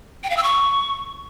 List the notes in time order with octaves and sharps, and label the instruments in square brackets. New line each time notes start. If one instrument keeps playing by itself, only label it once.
[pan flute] G5
F5
E6
C#6